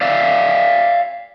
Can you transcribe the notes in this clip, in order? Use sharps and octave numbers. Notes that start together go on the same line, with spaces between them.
D5 E5 F5